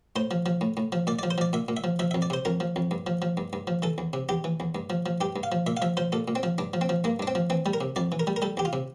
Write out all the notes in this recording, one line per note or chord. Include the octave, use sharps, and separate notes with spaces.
A2 C5
F3
F3
A2
A2
F3
A#2 D5
F3 D5
C5
F3 D5
A#2 E5
A#2
E5
F3
F3 E5
F2 E5
D5
C3 C5
F2 A#4
F3
F2
G2
F3
F3
G2
G2
F3
E3 A4
E2
C3
E2 G4
E3
E2
G2
F3
F3
G2 G4
G2
F5
F3
A#2 E5
F5
F3 E5
F3 C5
A#2 A4
A#2
C4
F3
G2 D4
F3
C4
F3
G2 A#3
G2 D4
C4
F3
E3 C4
G3
A#4
C3
F2 D5
E3
A#4
G3
A#4
G3 A4
E2 G4
F4
C3